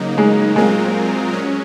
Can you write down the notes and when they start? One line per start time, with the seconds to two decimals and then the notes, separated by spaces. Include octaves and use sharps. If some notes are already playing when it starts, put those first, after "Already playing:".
Already playing: C#3 F#3 A#3 D#4
0.18 G#3
0.56 A#2 F#3 G#3 C4 F4 A#4
1.33 F#3 C#4